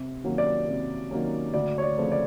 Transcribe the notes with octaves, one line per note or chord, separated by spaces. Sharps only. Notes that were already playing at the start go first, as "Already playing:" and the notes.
Already playing: C3
D#3 F#3 A#3 C#4
D5
C3
D#3 F#3 A#3 C#4
D2 D5
C#5
D5
C#3 F3 A3 C4
D5